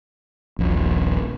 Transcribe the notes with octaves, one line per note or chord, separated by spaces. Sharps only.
D#1 A#1